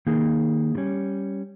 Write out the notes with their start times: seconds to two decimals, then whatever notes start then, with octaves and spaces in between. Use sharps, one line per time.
0.07 D#3 A#3 D#4 G#4
0.75 D#3 G3 C#4